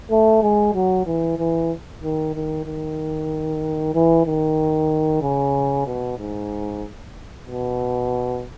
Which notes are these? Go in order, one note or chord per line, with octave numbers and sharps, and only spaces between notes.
A3
G#3
F#3
E3
E3
D#3
D#3
D#3
E3
D#3
C#3
B2
G#2
B2